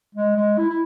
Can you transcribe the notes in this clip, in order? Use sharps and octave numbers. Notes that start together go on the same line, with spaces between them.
G#3
G#3
E4
E4